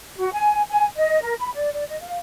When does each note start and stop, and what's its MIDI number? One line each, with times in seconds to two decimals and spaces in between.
0.16 0.30 66
0.33 0.62 80
0.69 0.87 80
0.96 1.20 75
1.22 1.34 70
1.40 1.51 83
1.54 1.70 74
1.74 1.83 74
1.87 1.98 75
2.01 2.17 77